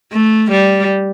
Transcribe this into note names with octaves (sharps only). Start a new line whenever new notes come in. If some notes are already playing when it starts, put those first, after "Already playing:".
A3
G3